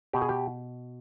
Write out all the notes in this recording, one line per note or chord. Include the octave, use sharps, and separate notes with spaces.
B2 G4
G#4
G4